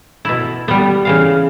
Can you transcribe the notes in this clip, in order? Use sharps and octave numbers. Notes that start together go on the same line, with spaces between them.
B2 E4
G3 B3
C#3 E3 F5